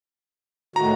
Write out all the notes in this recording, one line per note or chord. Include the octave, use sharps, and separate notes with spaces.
A2 D#3 F#4 A#5